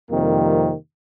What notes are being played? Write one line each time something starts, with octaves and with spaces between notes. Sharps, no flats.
F2 C3 D#3 G3 A#3